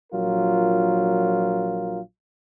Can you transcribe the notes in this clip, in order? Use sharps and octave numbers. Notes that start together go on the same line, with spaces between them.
A#1 F#3 F4 A#4